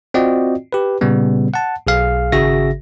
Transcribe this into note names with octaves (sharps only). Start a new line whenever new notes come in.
C4 F4 F#4 D5 D#5 G5
G4 B4
A#2 C#3 G3 B3
F#5 A5
B1 G#4 F5
G#1 C#3 F#4 G#4 E5 A#6